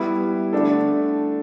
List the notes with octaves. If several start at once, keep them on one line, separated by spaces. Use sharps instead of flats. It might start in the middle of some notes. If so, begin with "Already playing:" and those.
Already playing: G3 B3 E4 B4
D3 A3 D4 A4